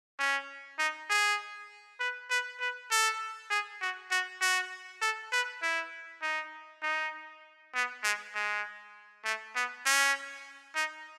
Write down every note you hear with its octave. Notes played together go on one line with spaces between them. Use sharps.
C#4
D#4
G#4
B4
B4
B4
A4
G#4
F#4
F#4
F#4
A4
B4
E4
D#4
D#4
B3
G#3
G#3
A3
B3
C#4
D#4